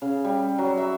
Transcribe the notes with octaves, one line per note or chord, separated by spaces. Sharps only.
C#3
G3
F#3
E5